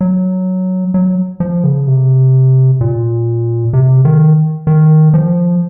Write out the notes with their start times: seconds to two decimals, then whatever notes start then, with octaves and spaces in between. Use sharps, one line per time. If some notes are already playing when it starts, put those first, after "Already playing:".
0.01 F#3
0.94 F#3
1.40 F3
1.64 C#3
1.87 C3
2.81 A#2
3.73 C3
4.05 D#3
4.67 D#3
5.14 F3